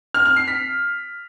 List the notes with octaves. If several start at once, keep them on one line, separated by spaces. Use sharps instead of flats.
F6
F6
C7
B6